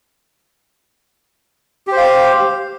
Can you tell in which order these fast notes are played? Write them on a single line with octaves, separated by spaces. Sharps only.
G4 C5 F5